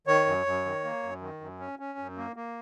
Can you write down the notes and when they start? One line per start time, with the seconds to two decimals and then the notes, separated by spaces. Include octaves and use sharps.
0.07 D#3 C#5
0.27 F#2
0.46 F#2
0.65 D#3
0.84 A#3
1.03 F#2
1.21 D#3
1.41 F#2
1.59 C#4
1.79 C#4
1.99 F#2
2.17 A#3
2.36 A#3